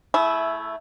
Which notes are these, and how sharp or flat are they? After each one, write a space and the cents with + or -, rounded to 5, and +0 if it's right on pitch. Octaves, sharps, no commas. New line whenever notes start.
A3 +5 E4 +0 G#4 +45